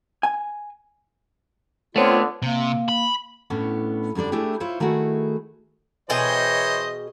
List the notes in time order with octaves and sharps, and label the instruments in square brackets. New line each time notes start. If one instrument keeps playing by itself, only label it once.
[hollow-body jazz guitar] G#5
[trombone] D3 [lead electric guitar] A3 B3 [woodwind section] C4 F4 [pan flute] C#5
[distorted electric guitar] C3 [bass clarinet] A#3
[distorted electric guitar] B5
[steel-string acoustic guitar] A2 B3 C#4 D4
F#2 D3 G3 D4 D5
A3 D4 E4 G4 G#4
E4 F4 C5 C#5 E5
D#3 A3 E4 F#4 G#4
[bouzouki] B2 G#4 G5 [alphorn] E3 [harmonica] C5 C#5 D#5